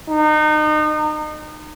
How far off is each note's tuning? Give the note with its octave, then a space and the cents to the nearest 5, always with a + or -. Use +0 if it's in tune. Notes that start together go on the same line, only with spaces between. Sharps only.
D#4 -30